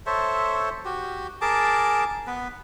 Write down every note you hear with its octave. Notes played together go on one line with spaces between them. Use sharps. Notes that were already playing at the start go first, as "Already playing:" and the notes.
A4 C5 C#5 E5
F#4 G4
G#4 A#4 A5 D6
B3 B4